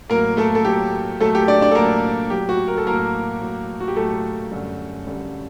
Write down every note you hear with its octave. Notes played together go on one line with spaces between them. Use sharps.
A2 F#3 A#3 A#4
A3 A4
A4
A2 F#3 G4
A2 F#3 A3 A4
G4
D4 D5
D4 D5
A4
A2 F#3 A#3 A#4
A2 F#3 G4
F#4
A#4
A4
A2 F#3 A#3 A#4
A2 F#3
F#4
G4
A2 F#3 A3 A4
F#2 D3 G3
F#2 D3 G3